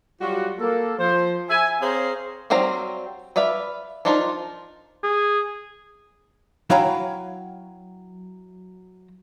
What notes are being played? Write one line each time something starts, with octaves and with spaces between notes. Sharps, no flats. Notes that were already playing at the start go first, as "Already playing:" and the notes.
F#3 G3 F4 F#4
A#3 A4
F3 C5
E5 G#5
C4 G#4 C5 C#5 F5 A#5
F#3 G3 C4 F5 A#5
B4 D5 E5 F5 B5
F3 D4 D#4 F4 A#4
G#4
F#3 E4 C#5 F5 G5 A#5